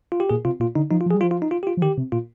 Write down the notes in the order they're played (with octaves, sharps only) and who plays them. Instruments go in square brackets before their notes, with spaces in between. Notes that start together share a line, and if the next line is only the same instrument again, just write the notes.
[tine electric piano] F4
G4
[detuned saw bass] A#2 [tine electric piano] G#4
[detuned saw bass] C3 [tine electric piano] F4
[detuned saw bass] A#2 [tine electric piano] F4
[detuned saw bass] D3 [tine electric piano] D#4
[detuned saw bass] F3 [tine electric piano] D#4
[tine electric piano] F4
[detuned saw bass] F3
[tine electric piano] G#4
[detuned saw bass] G3
[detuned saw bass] F3 [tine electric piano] F4
[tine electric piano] F4
D#4
F4
G4
F4
[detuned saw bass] F3
[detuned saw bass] D#3 [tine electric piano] G4
[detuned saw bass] C3
[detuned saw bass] A#2 [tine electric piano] F4